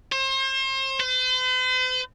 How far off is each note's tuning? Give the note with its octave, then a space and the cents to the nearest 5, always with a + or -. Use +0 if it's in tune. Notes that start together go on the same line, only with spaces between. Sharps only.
C5 +35
C5 -45